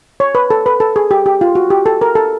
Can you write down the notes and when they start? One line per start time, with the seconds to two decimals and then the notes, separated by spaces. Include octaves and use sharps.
0.20 C#5
0.35 B4
0.50 A4
0.66 B4
0.80 A4
0.96 G#4
1.11 G4
1.26 G4
1.41 F4
1.55 F#4
1.70 G4
1.86 A4
2.01 A#4
2.15 A4